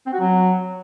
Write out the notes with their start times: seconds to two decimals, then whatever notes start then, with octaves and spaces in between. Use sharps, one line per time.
0.07 C4
0.13 F#4
0.20 F#3